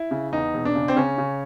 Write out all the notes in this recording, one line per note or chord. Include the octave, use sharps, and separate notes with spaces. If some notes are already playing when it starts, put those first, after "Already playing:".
Already playing: E4
C#3
E2 D#4
E1
D4
C#3
C4
C#3 C#4
C#3